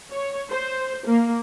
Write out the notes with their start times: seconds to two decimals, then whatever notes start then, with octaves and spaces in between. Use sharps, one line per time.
0.10 C#5
0.49 C5
1.06 A#3